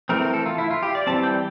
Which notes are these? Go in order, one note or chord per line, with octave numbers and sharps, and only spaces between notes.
E3 A3 C4 A#4
A#4
A4
F4
E4
F4
G4
D5
E3 G3 C4 A5
G5